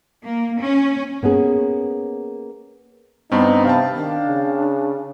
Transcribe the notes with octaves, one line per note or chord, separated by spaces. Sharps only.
A#3
C#4
A#3 B3 C#4 G#4
G2 B3 C4 D#4
C3 F5 G5 A5
D#3 D4
C#3